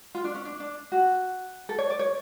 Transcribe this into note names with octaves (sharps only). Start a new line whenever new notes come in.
F4
D4
C#4
D4
D4
F#4
A4
C#5
D5
C#5